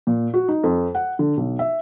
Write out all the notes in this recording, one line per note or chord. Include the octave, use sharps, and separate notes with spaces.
A#2
F#4
D#4
F2
F#5
D3
B1
E5